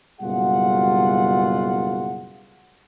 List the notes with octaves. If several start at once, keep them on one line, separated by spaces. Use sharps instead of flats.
F#1 B2 G3 F4 G#4 F#5